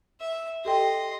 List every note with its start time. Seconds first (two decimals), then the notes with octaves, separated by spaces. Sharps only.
0.20 E5
0.65 G4 A4 D#5 G5 C6